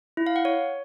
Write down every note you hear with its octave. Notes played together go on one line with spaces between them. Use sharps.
E4
F5
F#5
C#5